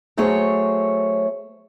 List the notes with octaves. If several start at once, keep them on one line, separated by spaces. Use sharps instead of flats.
F#3 A3 G#4 C5 C#5